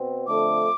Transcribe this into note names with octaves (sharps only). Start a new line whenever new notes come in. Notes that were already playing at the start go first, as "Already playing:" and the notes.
Already playing: B2 C4
F2 D3 A3 D6